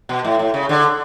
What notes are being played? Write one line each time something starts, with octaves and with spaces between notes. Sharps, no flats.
B2
A2
A2
C#3
D3